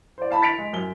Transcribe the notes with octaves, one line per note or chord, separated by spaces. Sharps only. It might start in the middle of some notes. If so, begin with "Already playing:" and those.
C5 D5
F5 A5 B5
A6 B6 C#7 D7 F7
G#3
F#2 G7